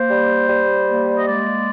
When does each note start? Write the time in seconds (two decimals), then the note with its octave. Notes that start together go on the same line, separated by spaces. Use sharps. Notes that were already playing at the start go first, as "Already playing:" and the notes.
Already playing: A#3 C5
0.09 G3
0.48 G3
0.87 A#3
1.15 D#5
1.26 G#3 D5